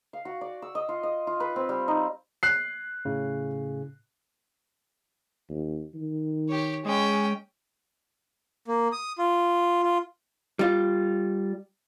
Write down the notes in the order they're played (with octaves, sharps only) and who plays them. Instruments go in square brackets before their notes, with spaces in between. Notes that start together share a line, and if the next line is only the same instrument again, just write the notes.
[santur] F5
F#4
D5
E6
D#5
F4
D#5
F4
B4
C4
G3
D#4
[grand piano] F#6 C7
[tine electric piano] A2 C#3
[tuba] D#2
D#3
[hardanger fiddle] G4 C#5
[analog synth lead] G#3 [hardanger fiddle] C#4 G5
[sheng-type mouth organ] A#3
D#6
F4
F4
[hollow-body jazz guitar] G3 F4